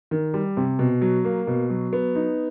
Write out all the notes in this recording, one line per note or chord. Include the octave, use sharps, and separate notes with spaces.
D#3
G3
C3
B2
F#3
A#3
B2
F#3
B3
D#4